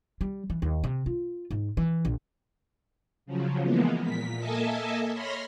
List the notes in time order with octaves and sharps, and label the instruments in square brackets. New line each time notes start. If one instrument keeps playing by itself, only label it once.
[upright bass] G3
E3
D#2
C3
F4
G#2
E3
A#1
[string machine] C#3 F3 F#3
E3 F3 G#3 A#3 B3
A#2 B6
A#3 A4 D#5 E5 G#5 A5
C#5 B5 C6 F6 A#6